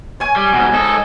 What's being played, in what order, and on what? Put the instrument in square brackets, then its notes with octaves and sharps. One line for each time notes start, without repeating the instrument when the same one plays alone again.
[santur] C#5 G#5
[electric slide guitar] G3
G#2 B2
[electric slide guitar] G#2 A4 [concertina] D#5